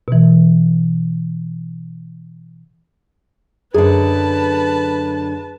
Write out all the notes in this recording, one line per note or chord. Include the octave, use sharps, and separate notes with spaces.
B2 E3
F#2 D3 G#4 B4 A5